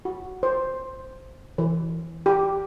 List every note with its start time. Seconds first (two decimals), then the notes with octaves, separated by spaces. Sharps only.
0.05 F#4
0.43 C5
1.58 E3
2.26 G4